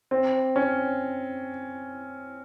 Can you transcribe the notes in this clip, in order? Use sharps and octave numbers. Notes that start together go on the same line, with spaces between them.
C4
C#4